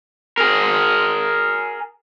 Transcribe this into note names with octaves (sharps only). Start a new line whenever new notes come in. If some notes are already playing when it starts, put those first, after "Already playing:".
G#4 A#4